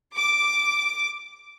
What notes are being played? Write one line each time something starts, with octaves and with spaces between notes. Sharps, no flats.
D6